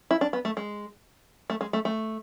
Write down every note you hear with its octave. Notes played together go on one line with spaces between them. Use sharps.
E4
D4
B3
A3
G#3
A3
G#3
A3
A3